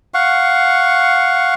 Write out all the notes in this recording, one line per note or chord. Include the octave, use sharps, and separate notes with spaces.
F5 F#5 C#6